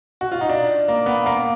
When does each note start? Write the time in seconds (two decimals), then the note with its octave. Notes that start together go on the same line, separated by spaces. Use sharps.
0.21 F#4
0.32 F4
0.41 D#4
0.49 D4
0.88 A#3
1.06 B3
1.26 A#3